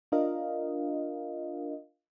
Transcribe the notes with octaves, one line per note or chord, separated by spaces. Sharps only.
D4 F4 A#4 D#5 F5